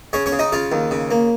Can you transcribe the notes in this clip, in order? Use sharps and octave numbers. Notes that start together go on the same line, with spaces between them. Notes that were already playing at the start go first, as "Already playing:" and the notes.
C#3 C#4 C#5
C#4 C#5
C#3
D#4 D#5
C#3 F4 F5
D#2
C#3
A#3